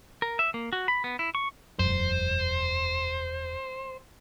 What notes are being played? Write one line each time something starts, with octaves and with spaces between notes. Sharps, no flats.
A#4
E5
A#3
F#4
B5
B3
E4
C#6
E1 F#2 C5